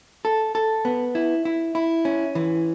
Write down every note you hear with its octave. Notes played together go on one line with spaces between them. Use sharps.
A4
A4
B3
E4
E4
E4
C#4
E3